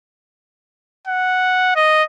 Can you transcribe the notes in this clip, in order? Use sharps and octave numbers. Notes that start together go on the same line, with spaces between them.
F#5
D#5